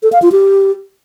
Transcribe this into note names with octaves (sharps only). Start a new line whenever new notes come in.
A4
F5
F4
G4